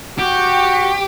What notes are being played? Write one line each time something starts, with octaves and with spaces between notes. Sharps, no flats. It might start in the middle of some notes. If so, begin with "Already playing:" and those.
F#4 G4